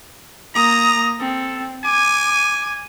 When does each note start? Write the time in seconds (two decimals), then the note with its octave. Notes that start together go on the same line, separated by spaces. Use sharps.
0.55 A#3 A#5 D#6
1.20 C4 A4
1.84 G#5 D6